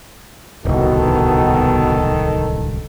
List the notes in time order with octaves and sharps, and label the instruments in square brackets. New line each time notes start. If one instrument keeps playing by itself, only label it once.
[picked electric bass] D1 C2 [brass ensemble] B2 [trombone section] D#3 A4